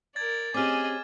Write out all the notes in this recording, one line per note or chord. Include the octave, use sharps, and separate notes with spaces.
A#4 D5 G#6 A6
C4 C#4 G4 G#4 D#5 D6 F6